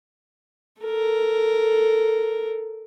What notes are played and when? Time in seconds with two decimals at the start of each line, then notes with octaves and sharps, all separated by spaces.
0.82 A4 A#4